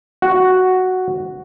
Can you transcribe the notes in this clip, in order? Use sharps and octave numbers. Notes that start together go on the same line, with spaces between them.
F#4